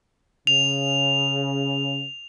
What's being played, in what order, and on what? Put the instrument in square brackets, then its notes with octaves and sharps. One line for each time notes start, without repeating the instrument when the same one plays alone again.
[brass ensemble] C#3 [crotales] F7